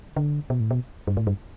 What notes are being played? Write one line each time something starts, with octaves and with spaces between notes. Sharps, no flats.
D3
B2
A2
B2
G2
A2
G2